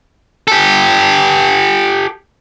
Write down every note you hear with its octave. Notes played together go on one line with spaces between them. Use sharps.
G4 A4